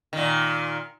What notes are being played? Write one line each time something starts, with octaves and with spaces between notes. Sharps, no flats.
A#2 D#3